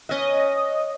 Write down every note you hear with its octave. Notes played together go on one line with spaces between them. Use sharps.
C#4 B4 D#5